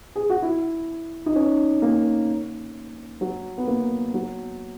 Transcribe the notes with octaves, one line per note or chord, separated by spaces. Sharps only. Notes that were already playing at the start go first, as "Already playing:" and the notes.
G#4
F#4
E4
D#4
C#4
A#3
F#3
B3
A#3
F#3